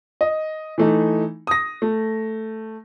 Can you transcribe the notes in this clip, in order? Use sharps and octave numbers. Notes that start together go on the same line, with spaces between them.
D#5
E3 A3 D#4
D#6 A#6
A3